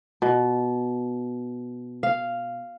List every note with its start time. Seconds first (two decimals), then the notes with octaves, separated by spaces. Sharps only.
0.22 B2
2.03 F5